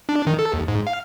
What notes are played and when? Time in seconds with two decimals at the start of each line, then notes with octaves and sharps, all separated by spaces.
0.09 D4
0.27 D#3
0.39 A4
0.53 D#2
0.68 G#2
0.87 F5